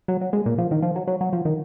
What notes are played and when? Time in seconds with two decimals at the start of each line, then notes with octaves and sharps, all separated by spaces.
0.08 F#3
0.21 F#3
0.33 G#3
0.46 A#2
0.58 F3
0.71 D#3
0.82 F3
0.96 F#3
1.07 F#3
1.21 F#3
1.33 F3
1.45 D#3